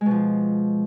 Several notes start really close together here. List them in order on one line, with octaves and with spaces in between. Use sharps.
G#3 B2 F3